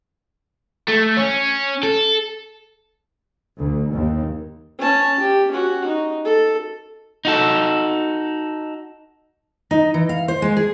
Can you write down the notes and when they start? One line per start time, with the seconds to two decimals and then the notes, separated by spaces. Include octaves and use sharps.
0.88 A3
1.17 C#4
1.83 A4
3.58 D2
3.91 D#2
4.79 C#4 A5
5.19 G4
5.52 C#4 F#4
5.87 D#4
6.24 A4
7.25 D#4 F#4 A4
9.71 D#4
9.94 E3
10.09 F5
10.28 C5
10.42 G#3
10.57 G#4